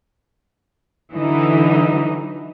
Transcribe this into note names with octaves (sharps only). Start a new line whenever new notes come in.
D3 E3 F#3 D#4 E4